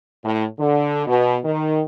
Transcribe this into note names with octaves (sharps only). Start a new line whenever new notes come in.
A2
D3
B2
D#3